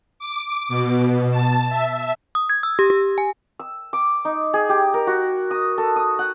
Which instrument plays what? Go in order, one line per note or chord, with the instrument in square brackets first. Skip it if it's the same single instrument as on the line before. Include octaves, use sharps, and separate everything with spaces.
[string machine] D6
B2
A5
E5
[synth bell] D#6
G#6
E6
G4
G4
G#5
[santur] E6
D6
D#4
G#4
G4
A#4
F#4
D#6
A4
D#6
F#5